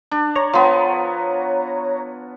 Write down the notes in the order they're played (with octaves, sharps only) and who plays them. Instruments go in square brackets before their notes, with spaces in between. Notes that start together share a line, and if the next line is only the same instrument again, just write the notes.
[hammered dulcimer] D4
[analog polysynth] C#5 A#5
[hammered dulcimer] F3 B3